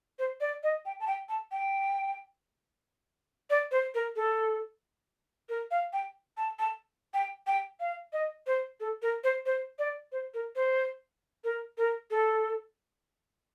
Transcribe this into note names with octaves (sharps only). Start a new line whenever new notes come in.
C5
D5
D#5
G5
A5
G5
A5
G5
D5
C5
A#4
A4
A#4
F5
G5
A5
A5
G5
G5
F5
D#5
C5
A4
A#4
C5
C5
D5
C5
A#4
C5
A#4
A#4
A4